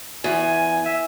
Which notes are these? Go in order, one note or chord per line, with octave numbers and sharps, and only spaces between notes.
E2 G#5
E5